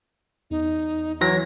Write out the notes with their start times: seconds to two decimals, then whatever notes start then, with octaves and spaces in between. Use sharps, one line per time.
0.51 E2 D#4
1.21 E3 F#3 C#5 A#6